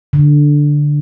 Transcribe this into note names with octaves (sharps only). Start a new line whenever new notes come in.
D3